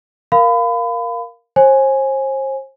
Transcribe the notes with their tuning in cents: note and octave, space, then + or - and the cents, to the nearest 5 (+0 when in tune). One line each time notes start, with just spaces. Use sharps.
A#4 +0 F5 +0 B5 +30
C5 +40 G#5 +0